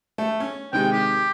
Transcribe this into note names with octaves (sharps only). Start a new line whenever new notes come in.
A3
C#4
C3 D#3 G#3 G5
G4